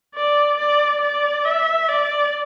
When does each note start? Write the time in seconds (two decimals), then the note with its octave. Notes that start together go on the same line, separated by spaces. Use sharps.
0.15 D5
0.58 D5
1.01 D5
1.45 E5
1.88 D5